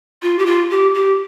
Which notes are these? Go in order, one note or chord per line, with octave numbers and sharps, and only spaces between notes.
F4
G4
F4
G4
G4